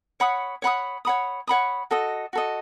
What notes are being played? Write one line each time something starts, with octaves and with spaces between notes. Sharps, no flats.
C#5 F#5 B5 D#6
C#5 F#5 B5 D#6
C#5 F#5 B5 D#6
C#5 F#5 B5 D#6
F#4 A4 D#5
F#4 A4 D#5